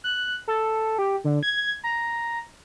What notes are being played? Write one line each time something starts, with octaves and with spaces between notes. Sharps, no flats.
F#6
A4
G4
D3
G#6
A#5